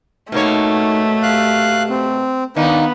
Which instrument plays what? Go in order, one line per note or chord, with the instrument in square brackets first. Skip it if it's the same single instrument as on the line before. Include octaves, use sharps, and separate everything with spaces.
[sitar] B2 A#3 C#5 [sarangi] A3 [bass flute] D#4
[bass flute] G4 [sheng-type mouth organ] F5 F#6
[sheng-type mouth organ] C4
[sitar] D#3 D#4 [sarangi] B3 [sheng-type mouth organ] D4 [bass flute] F5